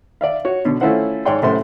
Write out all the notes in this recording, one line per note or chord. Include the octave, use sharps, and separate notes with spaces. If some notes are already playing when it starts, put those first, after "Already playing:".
D5 E5 F5
F#4 C#5
B2 D3
A3 C#4 E4 F4 C5 F#5
G#2 C#5 D5 G5 C6
C2 F#2 A2 A3 C5 C6